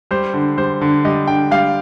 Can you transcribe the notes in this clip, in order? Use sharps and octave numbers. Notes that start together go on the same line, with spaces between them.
G3 C5
D3
G3 C5
D3
G3 D#5
D3 G5
G3 F5